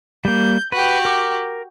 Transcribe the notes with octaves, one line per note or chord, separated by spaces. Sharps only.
G3 A#3 G6
F#4 G4 B4
A#4 D6